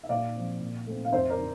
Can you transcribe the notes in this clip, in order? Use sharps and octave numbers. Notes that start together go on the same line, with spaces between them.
E5
A#2 D5 F5
F3 C4
A#2
A3 C4
F5
F2 C5 E5
A#4 D5
D3